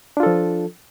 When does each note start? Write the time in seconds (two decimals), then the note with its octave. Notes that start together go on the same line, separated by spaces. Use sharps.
0.17 D4
0.20 F4
0.23 A4
0.26 F3